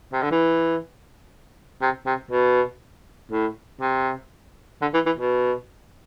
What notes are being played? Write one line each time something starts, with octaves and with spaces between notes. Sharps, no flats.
C3
D3
E3
C3
C3
B2
A2
C3
D3
E3
E3
B2